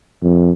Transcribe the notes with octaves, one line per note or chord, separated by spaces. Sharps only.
F2